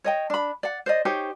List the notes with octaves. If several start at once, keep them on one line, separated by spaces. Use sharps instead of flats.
C#5 D#5 G5
D4 B5
D5 F#5
C5 D5 D#5
D#4 G4 C5 C#5